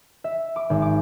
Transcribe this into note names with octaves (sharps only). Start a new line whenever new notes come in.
E5
D6
G#1
D6